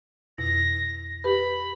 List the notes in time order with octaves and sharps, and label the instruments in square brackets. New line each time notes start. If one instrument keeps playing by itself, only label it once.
[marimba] F2 B2 E4 [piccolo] A#6
[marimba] G4 B4 [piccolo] B5